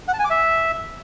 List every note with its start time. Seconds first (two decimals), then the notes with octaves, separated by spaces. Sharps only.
0.08 F#5
0.14 A5
0.19 G#5
0.25 D6
0.30 E5